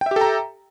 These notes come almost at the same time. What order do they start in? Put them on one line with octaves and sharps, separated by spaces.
G5 E5 G4 A4 A#5